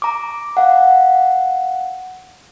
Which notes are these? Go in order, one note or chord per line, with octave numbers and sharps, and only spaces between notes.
A#5 D6
F5 F#5